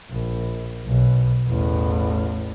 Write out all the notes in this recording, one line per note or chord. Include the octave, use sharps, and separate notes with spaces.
A#1
B1 B2
A1 E2